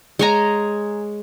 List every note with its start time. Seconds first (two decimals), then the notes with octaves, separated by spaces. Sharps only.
0.19 G#3 C#5 G#5 A#5